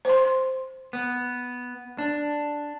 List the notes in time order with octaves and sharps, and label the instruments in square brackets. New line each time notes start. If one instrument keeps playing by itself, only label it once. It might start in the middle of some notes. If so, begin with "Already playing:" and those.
[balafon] C5 C6
[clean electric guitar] B3
D4